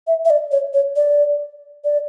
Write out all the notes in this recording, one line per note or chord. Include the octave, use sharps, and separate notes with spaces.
E5
E5
D5
C#5
C#5
D5
D5